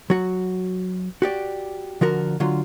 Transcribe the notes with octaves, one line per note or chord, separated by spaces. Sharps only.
F#3 F#4
F#4 G4 D5
D3 F3 F#4 A#4
D3 F#3 F4